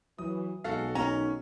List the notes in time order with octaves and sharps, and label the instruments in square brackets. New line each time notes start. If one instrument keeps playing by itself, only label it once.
[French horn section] E3 [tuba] F#3 [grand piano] D#6
[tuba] B1 [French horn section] G#3 [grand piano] F#4 A4 F5
[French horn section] D#3 F#3 D#4 [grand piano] C#4 [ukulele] A#5